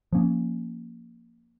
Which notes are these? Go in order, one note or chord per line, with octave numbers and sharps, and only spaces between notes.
F3 A#3 C#4